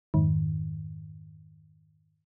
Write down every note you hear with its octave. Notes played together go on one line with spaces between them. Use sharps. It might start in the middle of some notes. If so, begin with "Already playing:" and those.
F2 G#2 D#3